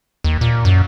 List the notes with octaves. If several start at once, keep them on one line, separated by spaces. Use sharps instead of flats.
D#2
A#2
F#2